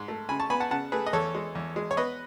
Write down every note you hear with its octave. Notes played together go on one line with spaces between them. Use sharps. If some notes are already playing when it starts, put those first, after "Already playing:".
Already playing: G#2
A3
C#3 G#5 B5
A5 C#6
B3 G#5 B5
F#5 A5
C#3 F#5 A5
A3 G#4 B4
D#5
E2 A4 C#5
G#3
E2
G#3
C#5
B3 B4 D#5